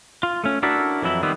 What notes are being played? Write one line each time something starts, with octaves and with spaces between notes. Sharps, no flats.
F4
A3 C#4
D4 E4 F#4 A4 A#4 E5
F2 E3 F#3 E4
D#3 G3 B3 C4